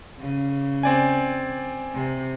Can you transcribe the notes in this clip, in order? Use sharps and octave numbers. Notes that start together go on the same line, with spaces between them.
C#3
C4 D5 G#5
C3